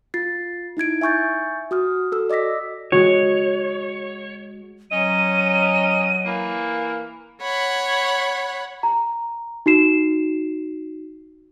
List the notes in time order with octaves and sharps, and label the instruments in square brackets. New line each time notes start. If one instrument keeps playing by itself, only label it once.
[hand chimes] F4 A6 C7
D#4 E4 G#6 D7
E5 G#5 C#6 G6 A6
F#4 D#6 F6
F#4 A4 E6
D5 D#5 D6 A#6 B6
[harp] G#3 F#4 [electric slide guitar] C#5
[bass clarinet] F#3 [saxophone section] C#4 D#5 [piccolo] D#7
[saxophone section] E3 A#3
[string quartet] C#5 F#5 B5
[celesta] A#5
D#4 F#4 C7 E7